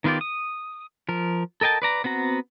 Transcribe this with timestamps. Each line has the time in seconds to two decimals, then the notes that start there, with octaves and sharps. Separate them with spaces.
0.04 D#3 B3 F4 G4 D5
0.21 D#6
1.09 F3 A#4
1.61 A4 A#4 D#5 G5 A5
1.82 B4 D5 A#5
2.04 B3 C4 F#4 A#5